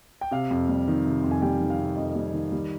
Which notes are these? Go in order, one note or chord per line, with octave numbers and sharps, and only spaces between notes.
G5
C3 F5
F2
G3
D#3
C3
F2
G#5
G3 G5
D#3
F5
C3
F2 D#5
G3
D#3
G3